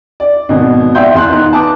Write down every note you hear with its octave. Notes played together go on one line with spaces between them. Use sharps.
D5
G#1 B2
D5 E5 F5 G5 C6 G6
E2 C6 F#6
B3 D#4
A5 D6 D#6